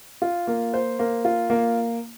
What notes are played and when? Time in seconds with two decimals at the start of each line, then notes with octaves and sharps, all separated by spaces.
0.22 F4
0.47 A#3
0.74 C5
0.99 A#3
1.25 F4
1.50 A#3